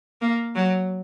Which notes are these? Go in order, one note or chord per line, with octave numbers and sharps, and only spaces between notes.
A#3
F#3